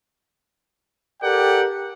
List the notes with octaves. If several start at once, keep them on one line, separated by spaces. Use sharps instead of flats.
G4 A4 A#4 D5 F#5 G5